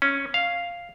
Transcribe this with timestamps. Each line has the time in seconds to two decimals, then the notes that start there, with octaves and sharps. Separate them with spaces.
0.02 C#4
0.34 F5